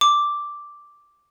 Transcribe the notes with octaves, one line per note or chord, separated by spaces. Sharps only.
D6